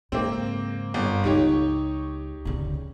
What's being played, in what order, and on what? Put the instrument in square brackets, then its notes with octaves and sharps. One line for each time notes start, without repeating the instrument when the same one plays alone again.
[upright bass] G#2 C#3 [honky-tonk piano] A#3 C4
[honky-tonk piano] G1
[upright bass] C#2 C#3 [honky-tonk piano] D#4 G4 C#5
[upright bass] D2 C#3